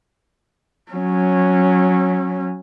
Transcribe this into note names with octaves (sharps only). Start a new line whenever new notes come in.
F#3 C#4